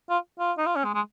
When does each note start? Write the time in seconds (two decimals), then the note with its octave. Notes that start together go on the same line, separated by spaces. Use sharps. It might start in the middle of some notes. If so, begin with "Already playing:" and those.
0.09 F4
0.39 F4
0.58 D#4
0.66 F4
0.76 C#4
0.84 G#3
0.94 G#3